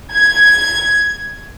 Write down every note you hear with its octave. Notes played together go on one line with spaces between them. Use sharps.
G#6